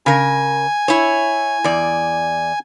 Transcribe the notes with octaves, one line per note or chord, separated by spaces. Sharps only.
C#3 A#4 G#5
E4 C#5
E2 D5